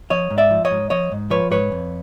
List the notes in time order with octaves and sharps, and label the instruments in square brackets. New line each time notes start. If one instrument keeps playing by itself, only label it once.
[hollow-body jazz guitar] F3 C#5 D#5
G#2
D5 E5
F3
C#5 D#5
G#2
F3 C#5 D#5
G#2
F3 B4 C#5
G#2 B4 C#5
F2